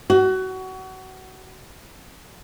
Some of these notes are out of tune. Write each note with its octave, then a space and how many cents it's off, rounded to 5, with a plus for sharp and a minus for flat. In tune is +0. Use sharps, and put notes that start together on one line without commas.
F#4 +25